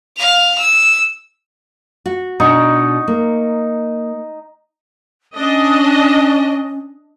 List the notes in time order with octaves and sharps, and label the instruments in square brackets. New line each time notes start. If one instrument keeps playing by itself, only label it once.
[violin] F5 F7
E6
[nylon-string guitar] F#4
[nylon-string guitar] B2 D4 [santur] D#4 C#6
[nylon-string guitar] A#3
[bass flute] C#4 [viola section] D4 D#5